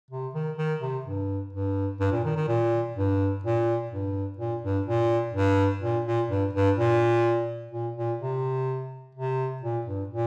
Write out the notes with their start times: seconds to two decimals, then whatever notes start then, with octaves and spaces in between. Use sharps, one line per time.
0.11 C3
0.34 D#3
0.58 D#3
0.81 C3
1.06 G2
1.53 G2
2.00 G2
2.12 A#2
2.25 D#3
2.36 D#3
2.48 A#2
2.96 G2
3.44 A#2
3.91 G2
4.38 A#2
4.63 G2
4.86 A#2
5.33 G2
5.82 A#2
6.05 A#2
6.28 G2
6.53 G2
6.77 A#2
7.71 A#2
7.96 A#2
8.19 C3
9.15 C3
9.62 A#2
9.86 G2
10.09 A#2